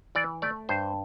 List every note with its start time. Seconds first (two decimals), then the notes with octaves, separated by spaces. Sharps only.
0.15 E3 D5
0.42 A3 D5
0.69 G2 C5